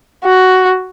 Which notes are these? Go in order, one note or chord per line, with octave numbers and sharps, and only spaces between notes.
F#4